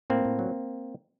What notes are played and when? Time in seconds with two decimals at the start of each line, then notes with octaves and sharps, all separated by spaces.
0.10 A2 A#3 C4
0.25 A2
0.39 F#3